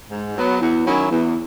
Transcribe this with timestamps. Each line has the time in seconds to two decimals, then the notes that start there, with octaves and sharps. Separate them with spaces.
0.10 G#2
0.36 F#3 B3
0.60 E2
0.85 D#3 F#3 C#4 E4
1.10 E2